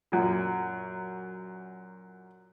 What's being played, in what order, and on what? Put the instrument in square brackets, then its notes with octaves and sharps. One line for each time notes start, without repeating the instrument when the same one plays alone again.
[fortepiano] F#2 A#2